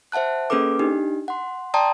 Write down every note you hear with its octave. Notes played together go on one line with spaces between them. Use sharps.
C5 E5 F#5 A5 F#6
A#3 C#4 G#4 A4 B4 D6
D4 D#4 G4
F#5 C6
D5 G5 A5 A#5 C6 D#6